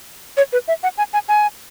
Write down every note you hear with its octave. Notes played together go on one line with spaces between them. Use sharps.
C#5
B4
E5
F#5
G#5
G#5
G#5